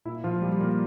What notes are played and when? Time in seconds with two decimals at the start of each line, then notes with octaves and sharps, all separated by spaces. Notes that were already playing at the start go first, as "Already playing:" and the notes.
0.05 A#2 E4
0.24 A#2 F3 F4
0.42 G3 A#3 G4
0.60 A#2 A#3 A#4